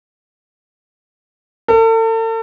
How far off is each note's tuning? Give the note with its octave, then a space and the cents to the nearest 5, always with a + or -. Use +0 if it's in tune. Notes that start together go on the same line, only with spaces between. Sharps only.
A4 +40